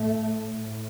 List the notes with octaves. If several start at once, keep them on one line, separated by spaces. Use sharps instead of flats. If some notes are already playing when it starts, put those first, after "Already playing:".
Already playing: A2 A3
A2